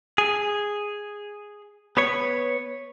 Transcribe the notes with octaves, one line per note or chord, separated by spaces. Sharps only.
G#4
B3 B4 C#5